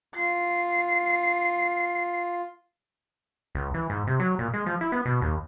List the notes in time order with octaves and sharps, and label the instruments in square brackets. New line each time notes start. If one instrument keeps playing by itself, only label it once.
[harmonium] F4 [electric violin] C7
[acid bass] C#2
E3
G#2
C3
F#3
A#2
G#3
F3
E4
B3
B2
D#2